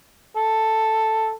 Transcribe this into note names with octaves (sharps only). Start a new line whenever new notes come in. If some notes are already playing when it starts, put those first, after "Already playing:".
A4